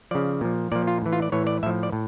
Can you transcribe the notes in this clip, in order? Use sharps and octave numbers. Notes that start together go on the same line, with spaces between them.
C#3 F3 D5
A#2 F3
A#2 F3 D5
F4
A2 E3
F4
D5
A2 E3 C#5
D5
A2 F3 E5
D5
A2